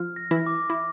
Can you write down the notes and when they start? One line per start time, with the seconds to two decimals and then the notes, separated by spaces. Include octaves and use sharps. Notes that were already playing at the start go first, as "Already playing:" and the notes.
Already playing: F3 F4 F6
0.16 A#6
0.31 E3 E4
0.46 D6
0.70 E4